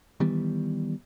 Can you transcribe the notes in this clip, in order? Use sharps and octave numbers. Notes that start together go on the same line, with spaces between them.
D#3 E3 G3 B3